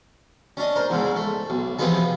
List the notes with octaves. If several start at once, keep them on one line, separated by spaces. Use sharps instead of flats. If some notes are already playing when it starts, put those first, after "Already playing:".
C#4 D4 D#5
A#4 C5
E2 G#2 C#3
A3
B1
C3 E3 F3 B3 D#4 G#4